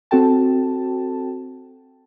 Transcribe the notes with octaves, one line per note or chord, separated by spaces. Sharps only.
C4 F#4 A4 G5 A5